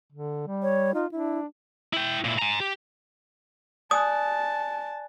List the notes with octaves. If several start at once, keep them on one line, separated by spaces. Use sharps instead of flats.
D3
G3
C#5
D#4 F4
D4 E4
E4 G5
A#2 E4
G#5 A#5
G4
D5 G#5 A5 D#6 F#6